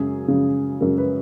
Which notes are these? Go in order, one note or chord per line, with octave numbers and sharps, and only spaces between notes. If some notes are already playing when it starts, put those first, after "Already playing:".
Already playing: F#2 C#3 G#3 G#4
F#2 C#3 G#3
F#2 C#3 G#3 A#4
B4